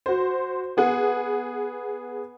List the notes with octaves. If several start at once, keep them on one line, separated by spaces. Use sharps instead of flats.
F#4 C5
B3 G#4 F#5